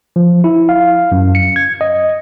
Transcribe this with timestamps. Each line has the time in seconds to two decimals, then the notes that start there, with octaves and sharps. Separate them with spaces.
0.16 F3
0.44 E4
0.69 F5
1.12 F#2
1.35 C#7
1.56 G#6
1.81 D#5